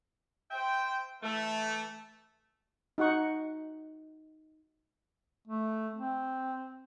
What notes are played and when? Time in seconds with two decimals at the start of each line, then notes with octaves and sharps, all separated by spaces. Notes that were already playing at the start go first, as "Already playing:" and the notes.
0.51 C5 E5 G5
1.23 E3 A3
2.98 D#4 F#4 F#5 C#6
5.47 A3
5.94 C4